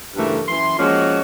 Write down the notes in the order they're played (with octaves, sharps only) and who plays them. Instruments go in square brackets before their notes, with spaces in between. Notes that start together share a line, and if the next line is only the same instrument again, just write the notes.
[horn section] G2 C#3 E3 A3 A#4
F#2 E3 C6
F3 G#3 A#3 C#4 F#4